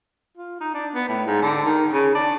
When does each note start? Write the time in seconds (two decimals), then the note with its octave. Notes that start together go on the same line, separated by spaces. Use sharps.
0.37 F4
0.61 D#4
0.74 D4
0.94 B3
1.08 A2
1.27 G#2
1.42 D3
1.65 D#3
1.93 C#3
2.15 D4